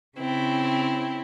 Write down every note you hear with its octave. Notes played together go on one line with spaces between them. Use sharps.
C#3 C4 E4